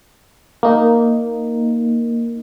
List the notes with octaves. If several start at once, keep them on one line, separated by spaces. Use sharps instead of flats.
A#3 D#4